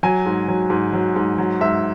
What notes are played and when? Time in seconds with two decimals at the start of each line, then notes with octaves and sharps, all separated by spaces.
0.03 F#3 G#5
0.26 G#2
0.48 F#3
0.70 G#2
0.93 F#3
1.16 G#2
1.38 F#3
1.61 G#2 E5